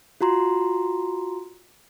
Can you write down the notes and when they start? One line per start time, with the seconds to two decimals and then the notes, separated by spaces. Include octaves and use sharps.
0.21 F4 F#4 A#5 C6